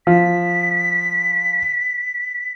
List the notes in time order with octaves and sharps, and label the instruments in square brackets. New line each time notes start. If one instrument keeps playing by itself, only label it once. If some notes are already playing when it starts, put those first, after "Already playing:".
[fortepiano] F3 [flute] B6